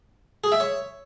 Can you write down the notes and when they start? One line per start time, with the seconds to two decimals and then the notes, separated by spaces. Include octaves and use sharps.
0.44 G#4
0.52 E5
0.60 C#5